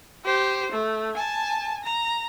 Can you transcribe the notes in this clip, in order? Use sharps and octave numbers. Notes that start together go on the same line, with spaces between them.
G4 C5
A3
G#5 A5
A#5